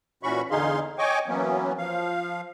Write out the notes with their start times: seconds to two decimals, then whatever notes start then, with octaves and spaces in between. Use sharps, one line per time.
0.23 A#2 E3 C#4 F#4 B5 C#6
0.51 E2 D3 D#4 G#4 F5 C6
0.98 C#5 D#5 G5 G#5 C#6 D6
1.27 E3 F#3 A#3 B3 C#4
1.78 F3 F5